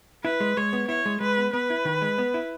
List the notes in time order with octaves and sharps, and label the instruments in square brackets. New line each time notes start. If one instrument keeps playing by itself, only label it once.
[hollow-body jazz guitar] E4 [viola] B4
[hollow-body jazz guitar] G#3
[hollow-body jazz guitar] G#3 [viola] C#5
[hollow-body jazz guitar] B3
[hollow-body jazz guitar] E4 [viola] C#5
[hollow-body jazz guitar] G#3
[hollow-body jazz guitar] G#3 [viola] B4
[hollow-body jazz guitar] B3
[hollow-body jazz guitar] B3 [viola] B4
[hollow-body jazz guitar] E4
D#3
G#3
B3
E4